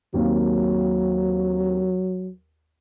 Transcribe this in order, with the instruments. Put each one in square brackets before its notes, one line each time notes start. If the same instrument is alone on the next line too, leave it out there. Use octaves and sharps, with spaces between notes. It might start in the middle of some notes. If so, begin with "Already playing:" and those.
[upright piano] D#2 A#3 C4 [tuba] F#3